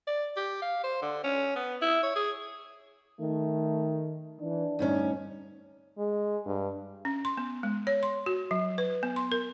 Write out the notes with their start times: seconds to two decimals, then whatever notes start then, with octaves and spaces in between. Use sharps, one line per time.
0.07 D5
0.36 G4
0.62 F5
0.83 C5
1.02 D3
1.24 C#4
1.55 B3
1.82 E4
2.03 C#5
2.15 G#4
3.20 D#3 A3
4.41 E3 D4
4.79 D2 G2 C#4 D#4
5.98 G#3
6.46 G2
7.05 C#4
7.25 C6
7.38 B3
7.63 G#3
7.87 C#5
8.03 C6
8.26 F#4
8.51 F#3
8.78 B4
9.03 B3
9.16 C6
9.32 A#4